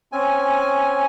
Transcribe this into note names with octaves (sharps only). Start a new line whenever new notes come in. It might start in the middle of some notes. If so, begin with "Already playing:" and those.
C4 C#4 G#5